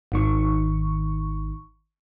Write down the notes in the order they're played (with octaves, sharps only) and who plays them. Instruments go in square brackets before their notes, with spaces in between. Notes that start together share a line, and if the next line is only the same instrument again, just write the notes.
[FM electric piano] G#1 D#3 C#6